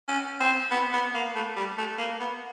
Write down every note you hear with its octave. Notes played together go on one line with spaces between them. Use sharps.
C#4
C4
B3
B3
A#3
A3
G3
A3
A#3
B3